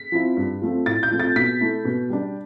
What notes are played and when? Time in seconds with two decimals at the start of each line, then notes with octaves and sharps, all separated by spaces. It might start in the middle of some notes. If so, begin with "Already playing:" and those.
Already playing: B6
0.12 F3 C4 E4
0.37 G2
0.62 F3 A3 C4
0.86 A2 A6
1.03 G6
1.11 F3 A3 C4
1.20 A6
1.36 B2 B6
1.61 A3 E4
1.85 B2
2.10 G3 D4